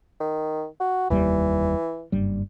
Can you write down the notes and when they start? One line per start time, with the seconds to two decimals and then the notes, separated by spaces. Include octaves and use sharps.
0.20 D#3
0.80 F#4
1.10 F1 D#2 E3 G3
2.12 F#1 G2 G3